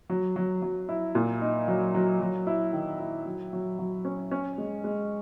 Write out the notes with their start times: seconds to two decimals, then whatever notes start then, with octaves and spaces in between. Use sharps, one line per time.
0.10 F#3
0.36 F#3
0.62 F#3
0.89 E4
1.15 A#2
1.41 D#4
1.68 F#3
1.94 F#3
2.21 F#3
2.47 E4
2.73 D#3
3.00 E4
3.26 F#3
3.53 F#3
3.79 F#3
4.05 C#4
4.31 C#4
4.58 G#3
4.84 G#3